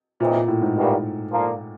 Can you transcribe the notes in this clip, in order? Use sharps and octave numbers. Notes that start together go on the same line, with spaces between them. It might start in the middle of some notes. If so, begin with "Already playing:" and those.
A#2 C#3 E3 A3 C4 D#4
A#2
A2
G#2
E2 B2 G3 A#3
D3 F3 A#3